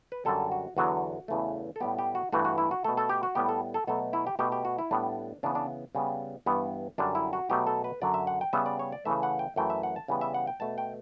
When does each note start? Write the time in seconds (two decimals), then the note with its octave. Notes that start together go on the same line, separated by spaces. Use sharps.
0.12 B4
0.25 F#2 D3 G3 A4
0.52 F#4
0.77 E2 D3 F#3 B3 F#4
1.28 E2 C#3 E3 A3
1.76 A4
1.80 A2 G3 B3 G4
1.98 G4
2.15 F#4
2.32 G2 E3 A3 F#4
2.45 F#4
2.58 E4
2.71 F#4
2.84 B2 A3 A4
2.97 A4
3.09 G4
3.23 F#4
3.35 A2 G3 B3 G4
3.49 A4
3.74 A4
3.87 B2 F#3 A3 A4
4.13 E4
4.27 G4
4.39 B2 A3 G4
4.52 G4
4.65 F#4
4.79 E4
4.91 A2 G3 B3 D4
5.43 C#3 E3 B3 D4
5.55 D4
5.95 C#3 G3 B3
6.46 G2 E3 G3 B3
6.98 F#2 D3 G3 D4
7.15 E4
7.33 F#4
7.50 B2 F#3 A3 G4
7.67 A4
7.84 B4
8.02 F#2 D3 F#3 D5
8.14 E5
8.27 F#5
8.41 G5
8.53 C#3 G3 B3 E5
8.66 D5
8.79 C#5
8.92 D5
9.05 C#3 E3 A3 E5
9.23 F#5
9.39 G5
9.56 F#2 E3 A3 G5
9.70 E5
9.83 F#5
9.96 A5
10.08 C#3 E3 G3 B3
10.21 E5
10.34 F#5
10.47 G5
10.60 B2 A3 A5
10.78 G5